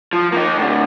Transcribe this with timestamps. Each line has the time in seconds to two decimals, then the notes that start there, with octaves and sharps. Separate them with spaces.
0.13 F3
0.32 A#3 D#4
0.58 A2 D3